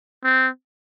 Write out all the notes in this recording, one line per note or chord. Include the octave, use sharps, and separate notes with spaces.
C4